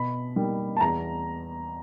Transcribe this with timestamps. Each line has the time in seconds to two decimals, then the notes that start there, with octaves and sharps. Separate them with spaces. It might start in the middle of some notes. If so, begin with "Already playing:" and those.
Already playing: B2 B5
0.36 G3 A#3 D#4
0.77 A5
0.80 E2 A#5